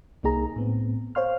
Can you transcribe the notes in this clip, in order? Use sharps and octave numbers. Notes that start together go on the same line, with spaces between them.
C2 A#3 D#4 G#4 A#5
A2 B3 C4
C5 C#5 F5 C6 F6